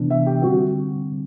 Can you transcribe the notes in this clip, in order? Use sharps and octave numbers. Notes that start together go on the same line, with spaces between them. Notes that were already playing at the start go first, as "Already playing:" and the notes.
Already playing: C3 E3 B3 D4
E5
G4
D3 G3 C4 F#4